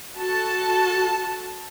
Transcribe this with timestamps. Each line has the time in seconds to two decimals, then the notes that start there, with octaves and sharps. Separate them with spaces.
0.18 F#4 A4 A5